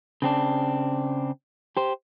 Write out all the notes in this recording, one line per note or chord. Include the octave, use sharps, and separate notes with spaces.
C#3 C4 D4
G4 C5